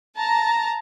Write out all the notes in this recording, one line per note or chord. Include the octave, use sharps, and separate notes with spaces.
A5 A#5